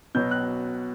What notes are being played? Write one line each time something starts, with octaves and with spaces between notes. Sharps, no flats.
B2 F#3 G6
F#6